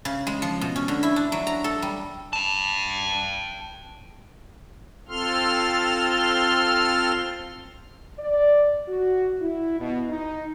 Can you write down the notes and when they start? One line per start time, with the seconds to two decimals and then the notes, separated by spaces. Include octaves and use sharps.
0.05 C#3
0.27 G#3
0.42 F3
0.61 B2
0.76 C#4
0.88 D3
1.03 E4
1.16 D4
1.32 F#3
1.47 A#5
1.64 A4
1.82 G3
2.33 G5 A5
5.08 C4 F4 A4 C6 F6
8.19 D5
8.88 F#4
9.41 E4
9.80 B2
10.09 D#4